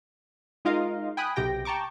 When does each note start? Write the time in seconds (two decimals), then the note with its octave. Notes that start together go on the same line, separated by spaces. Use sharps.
0.65 G#3 D#4 F4 A#4 D#5 F5
1.17 G5 G#5 B5 D#6 F#6
1.36 B1 C3 G4 G5 A#6
1.65 G5 A5 A#5 C#6 D6